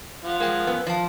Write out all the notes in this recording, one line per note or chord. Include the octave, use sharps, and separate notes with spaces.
F3 F5 F#5
G#3 A#4 G5
F#2 B3
F3 F5 A5